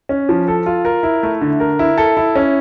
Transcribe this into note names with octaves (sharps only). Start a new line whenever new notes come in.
C#4
F3
A4
F4
A#4
E4
A3
D3
A#4
E4
A4
E4
C#4